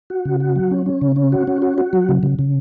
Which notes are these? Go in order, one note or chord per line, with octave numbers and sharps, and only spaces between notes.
F#4
C#3
F#4
F#3
C#4
C#4
C#3
C#4
F#4
C#4
F#4
F#4
F#3
C#3
C#3
C#3